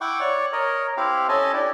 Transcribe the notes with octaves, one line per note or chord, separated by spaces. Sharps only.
E4 F#5 G5 C#6 D6
C#5 D5 C#6
A#4 C#5 D#5
C4 E4 G4 F5
C#4 A4 D#5 G#5 A5
D4 E4 G4